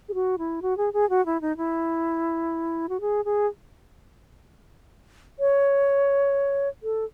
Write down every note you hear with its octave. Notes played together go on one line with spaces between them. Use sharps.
G#4
F#4
E4
F#4
G#4
G#4
F#4
E4
D#4
E4
F#4
G#4
G#4
C#5
A4